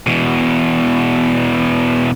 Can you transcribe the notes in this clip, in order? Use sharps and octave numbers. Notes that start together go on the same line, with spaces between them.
E2 B2